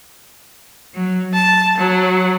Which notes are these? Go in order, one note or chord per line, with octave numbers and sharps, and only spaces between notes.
F#3
A5
F#3